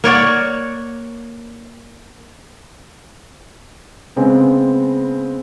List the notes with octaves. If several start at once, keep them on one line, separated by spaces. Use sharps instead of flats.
A#3 C#5 D5 F#5
C#3 G#3 B3 C4